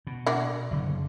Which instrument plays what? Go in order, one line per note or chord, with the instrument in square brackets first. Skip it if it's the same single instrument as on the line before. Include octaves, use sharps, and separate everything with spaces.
[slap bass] B2
[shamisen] A#3 D4 F#4
[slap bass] F#1 D3